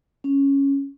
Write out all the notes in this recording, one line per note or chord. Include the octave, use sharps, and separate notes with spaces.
C#4